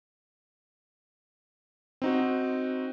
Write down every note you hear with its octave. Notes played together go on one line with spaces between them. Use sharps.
C4 D#4 F#4